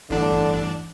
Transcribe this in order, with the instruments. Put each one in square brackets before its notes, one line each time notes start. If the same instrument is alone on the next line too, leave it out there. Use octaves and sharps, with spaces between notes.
[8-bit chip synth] G1 D4 [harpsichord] E2 A2 [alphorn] D3